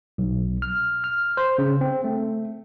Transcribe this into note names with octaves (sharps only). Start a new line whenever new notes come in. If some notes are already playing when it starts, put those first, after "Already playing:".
B1
F6
F6
C5
C#3
C4
A3